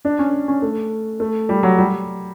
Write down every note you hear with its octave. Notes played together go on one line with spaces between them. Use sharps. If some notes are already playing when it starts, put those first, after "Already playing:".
D4
C#4
C#4
A3
A3
G3
F#3
G3